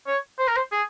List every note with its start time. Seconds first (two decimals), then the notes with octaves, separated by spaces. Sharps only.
0.07 C#5
0.39 C5
0.48 A#4
0.56 C5
0.72 G#4